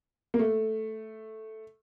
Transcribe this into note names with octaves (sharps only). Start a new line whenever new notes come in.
A#3
A3